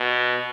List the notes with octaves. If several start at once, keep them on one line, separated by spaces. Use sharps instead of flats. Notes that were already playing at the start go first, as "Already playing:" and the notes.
Already playing: B2